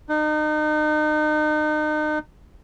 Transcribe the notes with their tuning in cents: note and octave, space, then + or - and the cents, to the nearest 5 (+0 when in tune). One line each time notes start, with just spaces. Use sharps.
D#4 -35